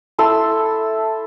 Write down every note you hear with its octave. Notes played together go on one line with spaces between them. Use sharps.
E4 A4 C6 E6